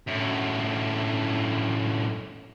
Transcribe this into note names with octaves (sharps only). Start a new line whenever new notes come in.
F#2 A2